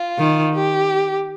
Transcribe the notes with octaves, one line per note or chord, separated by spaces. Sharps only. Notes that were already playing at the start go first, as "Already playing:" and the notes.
Already playing: F4
D#3
G4